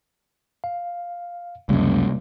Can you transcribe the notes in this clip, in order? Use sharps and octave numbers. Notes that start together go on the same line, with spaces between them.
F5
C#2 F#2 C3 G3 A#3